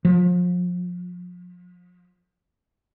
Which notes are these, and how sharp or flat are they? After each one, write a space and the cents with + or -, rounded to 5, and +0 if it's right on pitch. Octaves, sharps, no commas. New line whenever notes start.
F3 +35